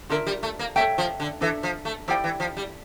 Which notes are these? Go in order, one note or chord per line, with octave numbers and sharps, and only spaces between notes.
D3 F4 A#4 E5
G3
A3
A#3
A3 A4 C#5 E5 G5
F3
D3
E3 D4 A4 E5
F3
A3
F3 E4 G4 D5 G5
E3
F3
G3